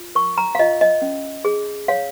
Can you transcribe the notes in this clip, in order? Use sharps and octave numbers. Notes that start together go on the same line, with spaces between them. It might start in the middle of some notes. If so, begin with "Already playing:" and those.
Already playing: F4
A#4 C#6
A#5
F5
F4 D#5
D#5
C#4
G#4
C#5 F5